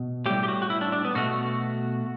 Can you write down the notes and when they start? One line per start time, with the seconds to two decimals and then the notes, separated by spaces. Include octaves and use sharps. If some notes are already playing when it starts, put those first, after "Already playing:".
Already playing: B2
0.26 A2 G3 G4
0.43 G4
0.48 F#4
0.62 F#4
0.70 E4
0.81 D4
0.92 D4
1.05 B3
1.15 B2 A3 F#4